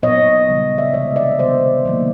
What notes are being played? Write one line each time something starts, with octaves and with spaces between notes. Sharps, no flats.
A#2 F#3 B3 C#5 D#5
C#3 E3 G3
D5 E5
C3 E3 G#3 C#5 D#5
D5 E5
C3 D#3 G3 B3 C5 D5
D#3 F#3 A#3